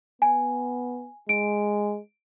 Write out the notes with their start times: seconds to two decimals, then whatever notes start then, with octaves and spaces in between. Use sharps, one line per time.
0.22 B3 G#5
1.29 G#3 D7